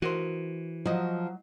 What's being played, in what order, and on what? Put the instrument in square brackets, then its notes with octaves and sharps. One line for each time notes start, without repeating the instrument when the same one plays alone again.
[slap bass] E3 [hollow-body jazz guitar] F#4 A#4 C5
[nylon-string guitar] F3 [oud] F#3 D#5